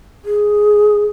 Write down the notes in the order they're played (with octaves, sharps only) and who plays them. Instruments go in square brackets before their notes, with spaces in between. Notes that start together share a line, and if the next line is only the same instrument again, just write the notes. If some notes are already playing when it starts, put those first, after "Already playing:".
[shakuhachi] G#4